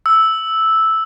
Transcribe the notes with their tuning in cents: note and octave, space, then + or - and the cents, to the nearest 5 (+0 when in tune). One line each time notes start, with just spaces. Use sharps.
E6 -5